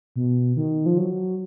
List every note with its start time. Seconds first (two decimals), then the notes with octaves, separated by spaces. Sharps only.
0.16 B2
0.57 D#3
0.86 F3
0.98 F#3